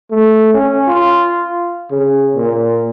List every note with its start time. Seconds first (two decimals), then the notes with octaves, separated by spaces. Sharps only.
0.11 A3
0.54 C#4
0.88 F4
1.91 C#3
2.36 A#2